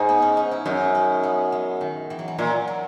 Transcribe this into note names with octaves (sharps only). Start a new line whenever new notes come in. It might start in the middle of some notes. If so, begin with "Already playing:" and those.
Already playing: G#2 D#4
B3
C#4
D#4
E4
F#2 D#4
C#4
B3
G#3
D#3
E3
F#3
E3
A#2 F#3
F#3